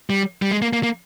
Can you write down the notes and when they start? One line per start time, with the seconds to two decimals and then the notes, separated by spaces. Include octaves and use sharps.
0.10 G3
0.42 G3
0.51 G#3
0.62 A#3
0.73 A#3
0.83 A#3